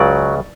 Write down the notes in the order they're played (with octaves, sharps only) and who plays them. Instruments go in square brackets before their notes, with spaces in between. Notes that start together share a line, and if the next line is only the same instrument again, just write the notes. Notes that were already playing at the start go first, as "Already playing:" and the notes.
Already playing: [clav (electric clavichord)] C#2 C#3 F#3 D5